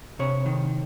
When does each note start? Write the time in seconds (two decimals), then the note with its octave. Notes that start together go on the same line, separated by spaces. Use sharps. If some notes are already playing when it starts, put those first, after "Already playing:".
0.19 C3 C#5
0.46 D#3